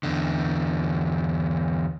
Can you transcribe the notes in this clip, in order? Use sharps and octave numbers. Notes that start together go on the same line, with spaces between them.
E2 D3